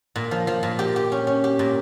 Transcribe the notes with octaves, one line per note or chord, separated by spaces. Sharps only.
A#2
F3
F3
A#2
G4
G4
C#4
C#4
G4
A#2